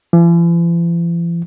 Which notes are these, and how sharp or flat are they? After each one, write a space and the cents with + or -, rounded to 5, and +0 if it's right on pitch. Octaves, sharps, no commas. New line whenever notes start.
E3 +45